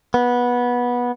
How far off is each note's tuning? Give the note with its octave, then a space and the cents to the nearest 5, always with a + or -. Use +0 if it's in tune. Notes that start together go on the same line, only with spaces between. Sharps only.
B3 -15